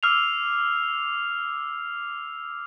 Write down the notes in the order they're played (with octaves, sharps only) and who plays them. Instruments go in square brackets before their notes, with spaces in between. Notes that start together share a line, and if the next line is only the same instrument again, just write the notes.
[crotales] D6 E6 F6 C7 F7